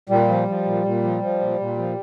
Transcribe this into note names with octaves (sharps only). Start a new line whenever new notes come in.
A#2 G3
F3
F3
A#2
A#2
F3
F3
A#2
A#2
F3